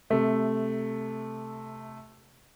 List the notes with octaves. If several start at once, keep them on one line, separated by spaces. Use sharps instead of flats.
C3 A3